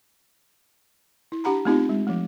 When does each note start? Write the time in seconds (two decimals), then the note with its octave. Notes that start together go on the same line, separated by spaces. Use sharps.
1.32 E4
1.44 D4 G4 F#5 A#5 B5
1.65 A3 B3 C4 D#4 F4 G4
1.89 G#3
2.07 F3 A3